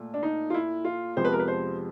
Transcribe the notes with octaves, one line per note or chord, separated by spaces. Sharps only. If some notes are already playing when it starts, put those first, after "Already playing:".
Already playing: A#2 A3
D4
D#4
F4
E4
F4
F2 C3 F3 G#3 B3 C5
B4
A#4
B4
C5